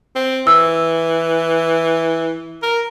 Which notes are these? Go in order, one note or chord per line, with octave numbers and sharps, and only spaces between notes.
C4
E3 E6
A#4